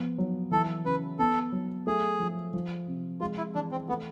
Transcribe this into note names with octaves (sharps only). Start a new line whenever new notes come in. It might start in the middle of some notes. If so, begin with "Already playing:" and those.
Already playing: F3 B3
F#3
E3 A4
C#3 B4
B3 A4
F#3
A3 G#4
F3
F3
C3
G#3 F4
E4
E3 D4
C4
A3 B3